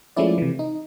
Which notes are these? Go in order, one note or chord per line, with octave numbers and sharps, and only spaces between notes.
F3 G#3 A3 C#4 E4 D5
C3 E3
D#4